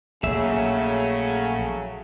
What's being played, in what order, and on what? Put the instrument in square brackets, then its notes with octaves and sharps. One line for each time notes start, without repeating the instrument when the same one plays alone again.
[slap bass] A#1 [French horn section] C#3 F#3 A3 [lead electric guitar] G#4 E5